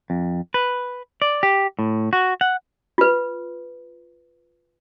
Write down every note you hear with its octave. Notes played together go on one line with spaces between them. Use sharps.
F2
B4
D5
G4
A2
F#4
F#5
F4 B4